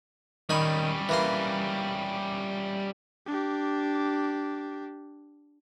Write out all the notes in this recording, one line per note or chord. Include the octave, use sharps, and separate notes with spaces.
D#3 G3 C#4 G#5 B5
E3 A#3 C6
D4 G4